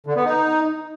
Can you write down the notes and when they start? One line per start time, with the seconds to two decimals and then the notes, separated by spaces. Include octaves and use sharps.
0.06 D3
0.16 B3
0.25 D#4